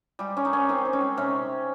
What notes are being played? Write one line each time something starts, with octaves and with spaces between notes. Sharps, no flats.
G3 G#3 G4
D#3 C#4
D#4
D#3 C#4
D#3 C4
D#3
C#4
G#3
C3 C#4